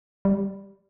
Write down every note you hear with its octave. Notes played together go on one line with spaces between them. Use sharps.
G3